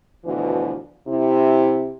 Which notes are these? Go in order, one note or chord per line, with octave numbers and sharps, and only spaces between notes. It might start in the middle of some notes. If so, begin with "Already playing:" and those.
D2 B2 E3 F3
C3 E4